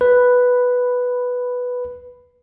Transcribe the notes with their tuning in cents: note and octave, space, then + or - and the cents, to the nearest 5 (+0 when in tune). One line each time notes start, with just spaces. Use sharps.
B4 +0 B5 +5